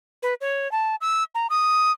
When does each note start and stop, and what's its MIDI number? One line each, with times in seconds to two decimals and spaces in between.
0.23 0.34 71
0.41 0.71 73
0.72 0.95 81
1.01 1.23 88
1.35 1.47 82
1.50 1.92 87